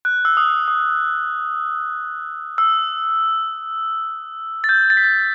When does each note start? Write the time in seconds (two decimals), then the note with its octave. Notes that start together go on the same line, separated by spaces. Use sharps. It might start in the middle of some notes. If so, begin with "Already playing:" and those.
0.05 F#6
0.25 E6
0.37 D#6
0.46 E6
0.68 D#6
2.58 E6
4.64 A6
4.69 G6
4.90 A6
4.97 B6
5.04 A6